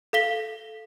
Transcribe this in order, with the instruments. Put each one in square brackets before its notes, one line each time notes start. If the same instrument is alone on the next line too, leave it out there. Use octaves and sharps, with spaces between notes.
[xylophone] A4 F5 B6 G7